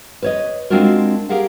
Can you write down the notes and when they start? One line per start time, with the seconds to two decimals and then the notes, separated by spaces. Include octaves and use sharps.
0.22 B4 C#5 D#5
0.70 G#3 C4 D4 F4 F#4 A#4
1.29 G4 G#4 A#4 F5 F#5